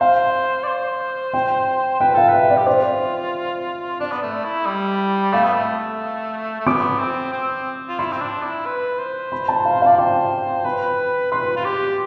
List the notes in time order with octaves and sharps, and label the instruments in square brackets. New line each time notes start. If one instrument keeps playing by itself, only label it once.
[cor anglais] C5 [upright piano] F5
[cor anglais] D5
C5
[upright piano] G5
[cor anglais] B4 [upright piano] G5
[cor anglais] A4 [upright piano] F5
[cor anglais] B4
[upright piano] E5
D5
[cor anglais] G4
[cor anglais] F4 [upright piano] C5
[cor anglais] D4 [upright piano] D5
[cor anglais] B3
A3
E4
G3
[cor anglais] A3 [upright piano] F5
[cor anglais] B3
A3
A3
[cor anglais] B3 [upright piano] D6
[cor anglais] C4
C4
F4
[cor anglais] E4 [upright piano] C6
[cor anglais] C4
D4
E4
B4
C5
[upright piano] B5
A5
F5
[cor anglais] D5 [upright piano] F5
[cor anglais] C5 [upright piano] G5
[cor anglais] B4 [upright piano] B5
[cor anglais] B4 [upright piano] C6
[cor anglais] F4
G4